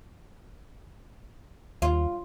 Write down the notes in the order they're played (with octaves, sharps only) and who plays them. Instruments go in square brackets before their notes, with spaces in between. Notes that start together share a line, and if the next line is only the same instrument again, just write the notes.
[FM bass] D#2 [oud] F4